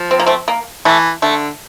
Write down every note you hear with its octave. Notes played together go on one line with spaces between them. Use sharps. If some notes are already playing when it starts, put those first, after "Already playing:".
Already playing: F3
C4
A#3
A3 C4
A#3
E3 A3
D3 A3